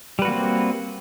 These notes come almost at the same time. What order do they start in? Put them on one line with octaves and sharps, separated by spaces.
G3 B4 F#4 A#3 C4